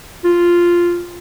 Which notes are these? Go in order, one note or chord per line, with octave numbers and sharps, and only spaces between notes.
F4